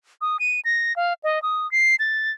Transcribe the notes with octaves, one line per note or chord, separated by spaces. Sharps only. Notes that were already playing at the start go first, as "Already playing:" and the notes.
D#6
D#7
A#6
F5
D#5
D#6
C7
A6